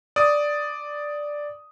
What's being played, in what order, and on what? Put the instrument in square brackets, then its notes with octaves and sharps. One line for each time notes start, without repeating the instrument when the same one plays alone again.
[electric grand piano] D5 D#6